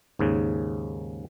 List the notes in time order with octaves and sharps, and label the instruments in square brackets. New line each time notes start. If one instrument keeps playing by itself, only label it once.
[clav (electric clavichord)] D#2 G#2 C#3